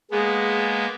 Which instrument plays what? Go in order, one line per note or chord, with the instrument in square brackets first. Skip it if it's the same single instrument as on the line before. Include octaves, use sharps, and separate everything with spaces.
[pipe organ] G#3 A#3 B3 [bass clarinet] G#4